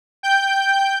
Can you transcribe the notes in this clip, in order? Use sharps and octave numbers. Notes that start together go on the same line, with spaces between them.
G5 G6